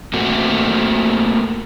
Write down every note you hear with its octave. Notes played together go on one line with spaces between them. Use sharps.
A3 A#3 C4 F#4